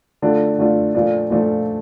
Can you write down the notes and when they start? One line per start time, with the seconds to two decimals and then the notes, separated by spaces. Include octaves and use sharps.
0.22 D3 A3 D4 F4
0.58 D3 A3 D4 F4
0.94 A#2 F3 A3 D4 F4
1.30 A#2 F3 A3 D4 F4